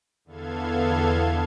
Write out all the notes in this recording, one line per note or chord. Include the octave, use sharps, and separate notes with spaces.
E2 D3 B3 A4 F5 G#6